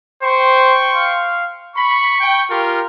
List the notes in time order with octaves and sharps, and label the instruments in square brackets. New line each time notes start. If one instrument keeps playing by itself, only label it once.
[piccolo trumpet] C5 [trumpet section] G5 C6 C#6
[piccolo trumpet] F5
[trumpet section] B5 [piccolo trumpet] C#6
[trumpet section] G5
F4 G4 A#4